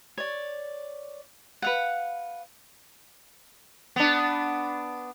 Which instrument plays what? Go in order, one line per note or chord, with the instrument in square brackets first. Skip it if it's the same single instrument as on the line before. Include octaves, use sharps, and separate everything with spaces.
[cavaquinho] C#5 D5
B4 F5 F#5
[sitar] B3 D4